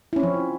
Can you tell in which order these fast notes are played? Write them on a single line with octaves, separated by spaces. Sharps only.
E4 C#4 C4 F3